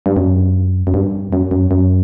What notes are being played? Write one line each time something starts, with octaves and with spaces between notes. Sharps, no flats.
G2
F#2
F#2
G2
F#2
F#2
F#2